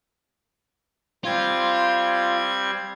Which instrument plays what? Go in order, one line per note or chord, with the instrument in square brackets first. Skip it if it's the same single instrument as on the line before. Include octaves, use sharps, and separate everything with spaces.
[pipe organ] G3 C4 G#6 [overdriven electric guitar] F4